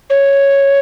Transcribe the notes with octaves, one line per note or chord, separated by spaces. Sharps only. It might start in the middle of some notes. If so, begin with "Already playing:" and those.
C#5